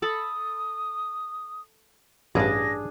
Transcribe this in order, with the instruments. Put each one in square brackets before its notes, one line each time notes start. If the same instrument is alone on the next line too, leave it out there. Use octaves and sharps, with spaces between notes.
[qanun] A4 A5 B5 [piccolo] D#6
[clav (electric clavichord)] A1 G2 [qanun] D4 G#4 [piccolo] A#6